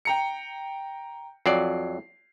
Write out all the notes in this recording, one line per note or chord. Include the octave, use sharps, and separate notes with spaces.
G5 A#5 C#7
F2 F#3 D5 C7